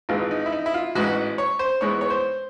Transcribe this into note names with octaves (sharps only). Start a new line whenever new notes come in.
G#1 G#2 E3 G#3 F4
D#4
E4
D#4
E4
F4
A1 G#2 E3 G#3 F#4
C#5
C5
G#2 E3 G#3 B3 C#5
C#5
C5